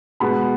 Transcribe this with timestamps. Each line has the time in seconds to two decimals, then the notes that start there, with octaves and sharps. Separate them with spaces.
0.20 B2 G#3 B3 B5